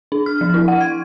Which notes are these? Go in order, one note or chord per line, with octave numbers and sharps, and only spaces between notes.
D4
F6
F3
E4
F#5
G#6